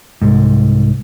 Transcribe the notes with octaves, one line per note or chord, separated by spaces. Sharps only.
C2 G#2